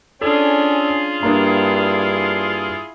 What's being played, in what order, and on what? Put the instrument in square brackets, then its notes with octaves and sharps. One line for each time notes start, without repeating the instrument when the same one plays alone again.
[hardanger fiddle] C#4 D4 [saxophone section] F4 G#4 [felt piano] A4
[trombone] G2 [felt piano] A#3 D4 [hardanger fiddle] E4